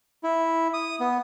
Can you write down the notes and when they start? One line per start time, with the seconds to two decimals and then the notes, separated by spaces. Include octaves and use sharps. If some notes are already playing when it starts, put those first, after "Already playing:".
0.24 E4
0.74 D#6
1.00 B3